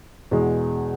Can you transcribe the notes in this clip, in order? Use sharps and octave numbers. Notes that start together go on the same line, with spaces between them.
E2 B2 G#3